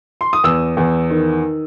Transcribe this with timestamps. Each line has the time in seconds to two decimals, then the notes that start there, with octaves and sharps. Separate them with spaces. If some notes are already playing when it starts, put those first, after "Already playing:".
0.21 C6
0.33 D#6
0.44 E2 E6
0.77 E2
1.10 D#3